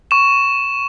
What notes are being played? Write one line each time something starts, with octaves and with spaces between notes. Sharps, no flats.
C#6 E7